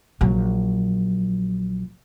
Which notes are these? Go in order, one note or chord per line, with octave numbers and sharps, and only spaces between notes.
A#1 F#3